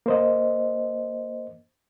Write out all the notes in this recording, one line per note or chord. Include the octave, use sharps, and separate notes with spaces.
A#3 C5 D#5